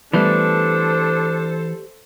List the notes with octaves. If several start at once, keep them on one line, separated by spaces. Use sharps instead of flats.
E3 G3 A3 B3 D4 A4 C5